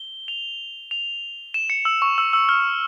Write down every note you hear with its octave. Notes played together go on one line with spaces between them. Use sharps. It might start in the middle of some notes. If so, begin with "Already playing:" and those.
Already playing: G7
F7
F7
E7
C#7
E6
C#6
E6
E6
F6